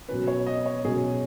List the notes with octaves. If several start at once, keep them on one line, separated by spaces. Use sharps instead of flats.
B2 F#3 C#4 B4
C#5
D#5
C#5
B2 F#3 C#4 G#4